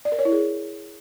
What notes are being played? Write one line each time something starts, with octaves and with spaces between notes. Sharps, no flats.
D5
A#4
C#5
E4
G#4